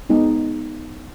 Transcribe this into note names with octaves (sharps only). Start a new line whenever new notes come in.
G#3 B3 D#4